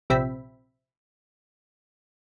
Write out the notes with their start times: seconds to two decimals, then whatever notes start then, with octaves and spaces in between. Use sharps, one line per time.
0.10 A#1 C3 C4 E5 B5